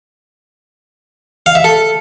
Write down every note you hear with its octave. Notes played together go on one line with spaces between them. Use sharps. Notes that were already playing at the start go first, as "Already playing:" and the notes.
F5
E5
A4